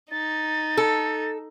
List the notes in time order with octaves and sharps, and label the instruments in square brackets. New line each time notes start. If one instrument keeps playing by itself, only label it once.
[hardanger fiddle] D#4 [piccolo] A6
[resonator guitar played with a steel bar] A4